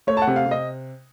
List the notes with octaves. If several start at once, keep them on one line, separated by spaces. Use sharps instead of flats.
A3 C#5
A5
F#5
C3
F5
C3
D#5